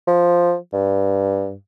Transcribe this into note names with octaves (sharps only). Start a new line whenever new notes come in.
F3
G2